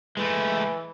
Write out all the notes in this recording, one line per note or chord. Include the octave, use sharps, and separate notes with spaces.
E3 G#3 A3